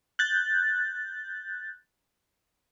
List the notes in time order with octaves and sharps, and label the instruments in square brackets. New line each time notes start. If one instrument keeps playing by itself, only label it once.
[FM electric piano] F#6 G6 A6